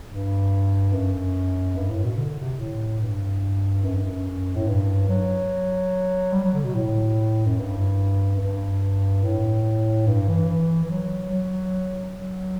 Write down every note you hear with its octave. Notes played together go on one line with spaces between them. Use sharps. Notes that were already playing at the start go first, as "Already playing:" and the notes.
G2
F#2
G2
A2
B2
D3
C3
A2
G2
F#2
G2
F#2
A2
G2
F#3
G3
F#3
D3
B2
A2
F#2
G2
F#2
G2
A2
G2
E3
E3
E3
F#3
F#3
F#3